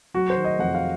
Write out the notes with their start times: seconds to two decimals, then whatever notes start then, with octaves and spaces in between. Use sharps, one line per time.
0.14 F#3 F#4
0.30 C5
0.36 D#3
0.44 D#5
0.59 F2 F#5
0.75 F5